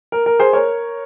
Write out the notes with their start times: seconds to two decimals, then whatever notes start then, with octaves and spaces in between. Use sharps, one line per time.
0.12 A#4
0.26 A#4
0.40 G#4 C5
0.53 A#4 C#5